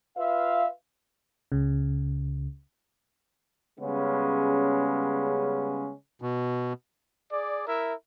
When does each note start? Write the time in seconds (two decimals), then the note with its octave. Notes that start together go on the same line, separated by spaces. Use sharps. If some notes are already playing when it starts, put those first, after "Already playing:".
0.17 F4 B4 E5 F5
1.52 C#2 C#3
3.80 C#3 G3 G#3 B3 C#4
6.22 B2
7.31 G#4 D5
7.66 E4 A#4 E5